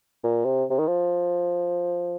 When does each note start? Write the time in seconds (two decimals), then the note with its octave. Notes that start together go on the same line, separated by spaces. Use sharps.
0.24 A#2
0.45 C3
0.70 C3
0.79 D#3
0.87 F3